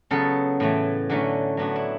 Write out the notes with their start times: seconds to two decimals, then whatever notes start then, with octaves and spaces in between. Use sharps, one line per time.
0.11 C#3 F#3 B3 A4
0.60 A2 E3 A3
1.10 D3 F#3 A3 C#4 A4
1.57 A2 F#3 B3 D4 F#4
1.76 E4